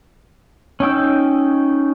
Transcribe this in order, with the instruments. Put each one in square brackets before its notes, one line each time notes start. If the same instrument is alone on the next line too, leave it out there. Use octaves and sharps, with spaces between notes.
[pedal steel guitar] C#4 D#4 G5 E6